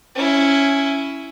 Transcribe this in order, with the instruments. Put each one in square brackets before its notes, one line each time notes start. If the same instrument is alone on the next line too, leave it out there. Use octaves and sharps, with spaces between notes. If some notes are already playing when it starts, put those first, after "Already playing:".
[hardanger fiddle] C#4 E4